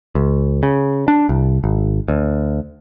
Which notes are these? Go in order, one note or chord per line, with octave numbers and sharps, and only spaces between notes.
C#2
C#3
D4
C2
G#1
D2